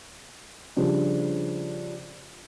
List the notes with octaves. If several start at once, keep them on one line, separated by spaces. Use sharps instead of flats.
C#3 F3 G3 D4